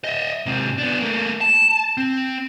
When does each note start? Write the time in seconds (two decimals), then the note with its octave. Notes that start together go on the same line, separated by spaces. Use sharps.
0.04 D#5 E5
0.46 G#2 C3
0.78 B3 D4
1.01 A3 A#3
1.41 A5
1.97 C4